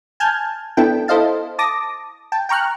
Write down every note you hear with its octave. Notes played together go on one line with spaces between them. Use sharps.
G#5 A5 F6 G6 G#6
B3 D4 E4 A4 G5
E4 A4 C5 D#5 F5 A5
A5 D6 D#6 A#6
G5 A5
G5 A#5 C#6 F6 F#6